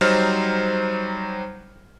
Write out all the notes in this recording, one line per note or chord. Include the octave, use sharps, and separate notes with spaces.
F#3 G3 D#4 C5 F6